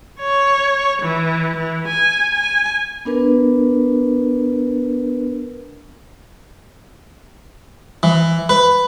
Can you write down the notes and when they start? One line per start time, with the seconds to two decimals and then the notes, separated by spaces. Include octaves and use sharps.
0.20 C#5
1.02 E3
1.56 E3
1.87 G#5
2.34 G#5
3.05 B3 D4 A#4 B4
8.03 E3
8.49 B4